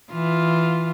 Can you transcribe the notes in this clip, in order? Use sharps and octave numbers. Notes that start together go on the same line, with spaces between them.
E3 F4